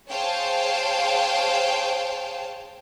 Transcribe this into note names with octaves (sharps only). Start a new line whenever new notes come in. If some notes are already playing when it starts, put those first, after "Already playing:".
G#4 C5 C#5 F5 G5 A5